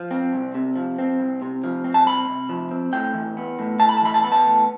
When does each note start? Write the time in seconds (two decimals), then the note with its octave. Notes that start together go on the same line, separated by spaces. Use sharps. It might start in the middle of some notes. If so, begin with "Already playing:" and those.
Already playing: F3
0.11 C4
0.33 C2
0.55 C3
0.76 F3
0.99 C4
1.20 C2
1.42 C3
1.64 F3
1.84 C4
1.94 A5
2.07 C2 B5
2.28 C3
2.49 F3
2.71 C4
2.93 A2 G5
3.14 E3
3.37 B3
3.59 A2
3.79 A2 A5
3.89 B5
3.97 A5
4.02 E3 B5
4.14 A5
4.23 B3 B5
4.32 A5
4.45 A2